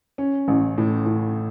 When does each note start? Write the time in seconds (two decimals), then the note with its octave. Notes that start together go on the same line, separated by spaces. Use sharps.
0.18 C#4
0.48 A1
0.78 A2
1.06 A2